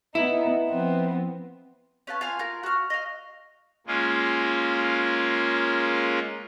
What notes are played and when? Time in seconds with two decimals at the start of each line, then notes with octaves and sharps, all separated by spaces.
0.15 B3 D#4 E4
0.69 F3 B3 C4
2.07 C#4 B4 F5 A5
2.21 F4 F5 G#5
2.39 F4 A#4
2.63 F#4 F6
2.90 D#5 F5
3.87 G#3 A#3 C#4 F4